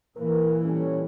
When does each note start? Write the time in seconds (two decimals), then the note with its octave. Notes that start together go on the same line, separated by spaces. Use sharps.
0.17 A#2 E3 A#3 A#4 B4
0.64 G3 C#4 A4